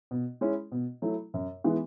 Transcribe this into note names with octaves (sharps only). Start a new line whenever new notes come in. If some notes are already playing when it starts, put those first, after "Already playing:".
B2
G#3 C#4 E4
B2
F#3 A3 E4
F#2
E3 G#3 B3